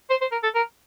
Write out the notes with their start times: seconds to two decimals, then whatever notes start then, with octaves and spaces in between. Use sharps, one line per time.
0.10 C5
0.21 C5
0.32 A#4
0.43 A4
0.55 A#4